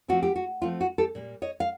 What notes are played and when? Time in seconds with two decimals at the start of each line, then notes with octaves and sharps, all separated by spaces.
0.08 F3 A3 C4 F#4
0.23 G4
0.36 F#4
0.62 F3 A3 C4 F4
0.81 F#4
0.98 G4 A4
1.15 A#2 G3 A#3
1.42 C#5 D#5
1.60 F5